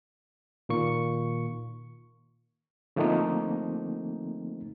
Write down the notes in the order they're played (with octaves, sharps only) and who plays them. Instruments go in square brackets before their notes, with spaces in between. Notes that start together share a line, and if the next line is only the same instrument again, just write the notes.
[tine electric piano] A#2 D#3 A#3 C#6 C#7
[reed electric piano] D3 F3 A3 A#3 C4 D#4